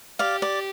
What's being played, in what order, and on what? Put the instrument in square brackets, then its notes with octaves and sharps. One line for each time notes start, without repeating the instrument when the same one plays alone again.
[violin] G4 [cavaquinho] D5 F5
[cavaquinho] D5